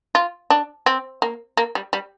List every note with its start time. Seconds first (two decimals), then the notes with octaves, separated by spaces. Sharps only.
0.15 F4
0.50 D4
0.86 C4
1.22 A#3
1.57 A#3
1.75 G3
1.93 G3